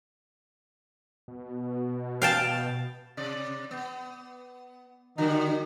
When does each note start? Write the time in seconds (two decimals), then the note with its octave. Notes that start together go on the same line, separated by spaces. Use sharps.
1.28 B2
2.22 F5 G5 A5
3.17 C3 D5
3.71 B3
5.18 D3 D#3 G3 D#4 F#4